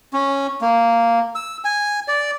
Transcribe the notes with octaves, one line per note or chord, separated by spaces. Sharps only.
C#4
A#3
E6
G#5
D5